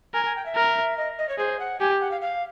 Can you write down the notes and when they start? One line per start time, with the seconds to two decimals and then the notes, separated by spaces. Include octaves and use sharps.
0.14 A#4 G#5
0.25 G#5
0.36 G5
0.46 E5
0.56 A#4
0.98 D#5
1.19 D#5
1.29 C#5
1.38 G#4 C5
1.59 F#5
1.80 G4 G#5
2.01 F#5
2.11 F5
2.22 F5